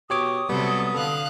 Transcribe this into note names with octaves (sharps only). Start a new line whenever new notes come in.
B2 G4 C#5 D6 D#6
C3 F#3 G3 B3 A4
D3 A4 F5 F#6